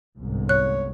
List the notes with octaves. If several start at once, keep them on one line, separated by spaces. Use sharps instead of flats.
G1 C2 G#2
C#5 F#6